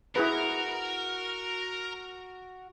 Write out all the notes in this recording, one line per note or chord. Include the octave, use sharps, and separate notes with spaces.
E4 F#4 G#4 A#4 B4